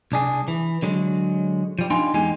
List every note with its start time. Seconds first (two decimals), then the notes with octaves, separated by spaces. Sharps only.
0.12 C2 D4 G#4
0.48 E3
0.82 D3 F#3 G#3
1.79 F3 G3
1.90 G3 D4 D#4 F4 G#5 C6
2.14 E2 G#3 D#4 G4 G#5